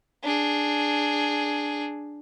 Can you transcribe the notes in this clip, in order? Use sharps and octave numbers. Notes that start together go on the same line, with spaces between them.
D4 G#4